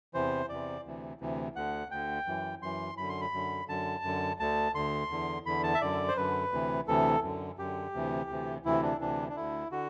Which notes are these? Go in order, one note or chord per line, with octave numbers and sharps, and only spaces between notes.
E2 C3 E3 C5
E2 C3 E3 D5
D2 C3 E3
D2 C3 E3
D2 D3 F#5
D2 D3 G5
F#2 E3
F#2 E3 C6
F#2 D3 B5
C6
B5
F#2 D3
F#2 D3 A5
F#2 D3
D2 D3 A5
D2 D3 C6
E2 D3
E2 D3 B5
A5
E5
F#2 D3 D5
C5
F#2 D3 B4
D2 C3 E3
D2 C3 E3 A4
F#2 D3
F#2 D3 G4
D2 C3 E3
D2 C3 E3
D2 C3 E3 E4
D4
D2 C3 E3 D4
D4
D2 D3 E4
D3 F#4